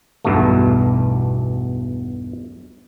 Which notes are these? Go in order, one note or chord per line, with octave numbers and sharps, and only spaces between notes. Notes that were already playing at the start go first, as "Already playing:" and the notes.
B1 E2 G2 B2 A3